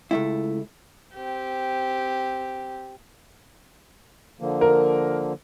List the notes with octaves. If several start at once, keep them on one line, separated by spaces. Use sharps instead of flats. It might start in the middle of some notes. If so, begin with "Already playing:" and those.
C#2 A3 E4
C4 G4
D3 F3 A#3
A#4